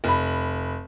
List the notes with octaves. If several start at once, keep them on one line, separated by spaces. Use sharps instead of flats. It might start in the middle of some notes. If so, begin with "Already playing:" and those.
F1 B5